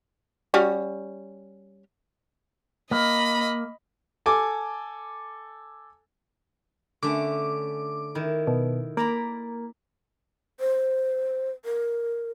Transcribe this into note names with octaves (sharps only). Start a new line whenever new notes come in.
G3 C#4 F#4
A#3 D#5 B5
A4 G#5 D6
D3 A3 C#4 D6
D#3 E4
B2
A#3 D5 A#5 B5
C5
A#4